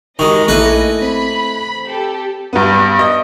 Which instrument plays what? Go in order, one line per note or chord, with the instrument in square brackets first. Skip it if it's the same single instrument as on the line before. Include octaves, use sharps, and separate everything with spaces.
[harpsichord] D#3 G#3 [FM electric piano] F#4 G4 G5 [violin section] D#5 [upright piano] C#6
[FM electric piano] A#1 [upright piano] A3 A#3 E4 [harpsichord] B4 G#5
[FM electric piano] C4 C5 [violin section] B5
[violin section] G4 A4
[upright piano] G2 B3
D#5